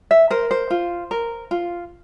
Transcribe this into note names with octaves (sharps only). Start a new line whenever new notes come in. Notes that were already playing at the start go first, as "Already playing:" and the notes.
E5
A#4 C5
C5
F4
A#4
F4